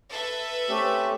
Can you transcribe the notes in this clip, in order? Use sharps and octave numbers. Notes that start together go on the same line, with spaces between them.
A4 B4 E5
A3 C4 C#4 G4